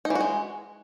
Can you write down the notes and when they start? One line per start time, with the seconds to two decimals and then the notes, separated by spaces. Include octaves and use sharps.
0.05 D#4
0.10 E3
0.15 F#4
0.21 G#3